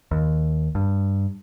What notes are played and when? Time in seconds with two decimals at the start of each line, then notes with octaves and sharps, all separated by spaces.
0.11 D#2
0.75 G2